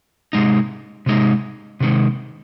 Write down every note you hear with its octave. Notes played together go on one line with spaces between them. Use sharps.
C3 G#3 D#4
C3 G#3 D#4
C3 D#3 G#3